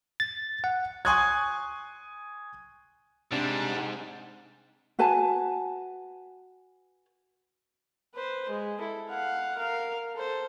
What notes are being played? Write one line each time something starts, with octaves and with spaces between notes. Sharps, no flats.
A6
F#5
G#5 C6 C#6 D#6 F#6 G#6
G#2 C3 G3 D4
F#4 B4 G#5 A5
B4 C5
G#3
E4 A4
F5 F#5
A#4 F5
A4 C5